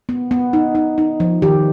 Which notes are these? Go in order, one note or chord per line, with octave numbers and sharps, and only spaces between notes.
B3
B3
D#4
D#4
D#4
F3
D#3 G4